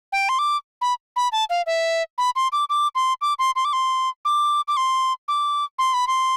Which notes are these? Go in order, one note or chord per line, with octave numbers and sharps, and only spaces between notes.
G5
C6
D6
B5
B5
A5
F5
E5
B5
C6
D6
D6
C6
D6
C6
C6
D6
C6
D6
D6
C6
D6
C6
B5
C6